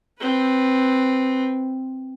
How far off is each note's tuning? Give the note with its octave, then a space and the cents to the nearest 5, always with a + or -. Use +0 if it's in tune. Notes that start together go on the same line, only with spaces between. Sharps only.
C4 +0 B4 +0